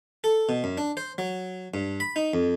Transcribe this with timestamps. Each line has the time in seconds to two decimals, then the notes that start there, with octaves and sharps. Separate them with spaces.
0.24 A4
0.49 B2
0.64 F#2
0.78 D4
0.97 C5
1.18 F#3
1.74 G2
2.00 B5
2.16 D#4
2.34 F2